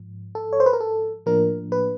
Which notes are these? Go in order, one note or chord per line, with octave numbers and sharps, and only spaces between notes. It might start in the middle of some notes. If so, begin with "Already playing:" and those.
Already playing: G#2 F3
A4
C#5
C5
B4
A#4
A4
A2 F3 A#3 D4 A#4
B4